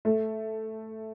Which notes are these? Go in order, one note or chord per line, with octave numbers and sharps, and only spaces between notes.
A3